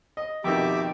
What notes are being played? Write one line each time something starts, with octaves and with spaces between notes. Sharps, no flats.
D#5
F2 B2 D#3 G4 E5 D6